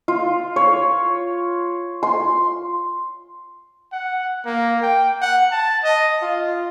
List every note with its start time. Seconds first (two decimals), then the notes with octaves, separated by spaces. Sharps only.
0.08 F4
0.56 C#5
2.03 C6
3.92 F#5
4.45 A#3
4.82 G5
5.22 F#5
5.52 A5
5.84 D#5
6.22 F4